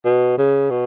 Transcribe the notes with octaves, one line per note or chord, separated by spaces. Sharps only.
B2
C#3
B2